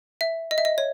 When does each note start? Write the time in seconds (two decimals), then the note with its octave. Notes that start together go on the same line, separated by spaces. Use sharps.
0.21 E5
0.51 D#5
0.58 E5
0.65 D#5
0.78 C#5